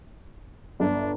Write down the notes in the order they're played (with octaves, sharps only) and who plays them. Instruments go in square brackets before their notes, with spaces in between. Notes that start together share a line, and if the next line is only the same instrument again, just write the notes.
[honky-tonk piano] G1 [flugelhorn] D4